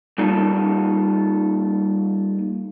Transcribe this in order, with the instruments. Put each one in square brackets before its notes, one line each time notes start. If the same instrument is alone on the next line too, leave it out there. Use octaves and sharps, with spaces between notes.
[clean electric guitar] G3 A#3 D#4 F4 A4